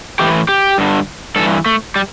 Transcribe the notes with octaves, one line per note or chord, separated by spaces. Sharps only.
A2 E3 G4
G4
G2 D3
G2 E3 A4
A3
G3